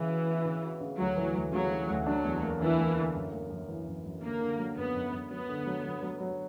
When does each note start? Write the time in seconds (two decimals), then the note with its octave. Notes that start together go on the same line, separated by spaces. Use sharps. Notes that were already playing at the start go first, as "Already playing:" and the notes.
Already playing: C#3 E3
0.09 F#4
0.27 B3
0.45 C#3
0.63 F#4
0.80 C#3
0.98 D2 F#3
1.16 E3
1.35 D2
1.52 C#3 F#3
1.71 E3
1.89 D2
2.06 F#3 D4
2.25 E2
2.43 A#3
2.60 E3 D4
2.79 A#3
2.96 D3
3.15 F#2
3.33 A#3
3.50 F#2
3.68 E3
3.87 F#2
4.05 F#2
4.22 D3 A#3
4.40 D3
4.58 F#3
4.77 F#2 B3
4.95 F#2
5.12 F#2
5.30 F#3 B3
5.49 D3
5.66 F#3
5.85 F#3
6.03 F#3
6.20 F#3